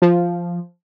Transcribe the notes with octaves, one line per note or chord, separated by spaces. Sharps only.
F3